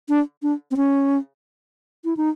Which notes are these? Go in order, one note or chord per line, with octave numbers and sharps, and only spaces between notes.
D4
D4
C4
C#4
E4
D#4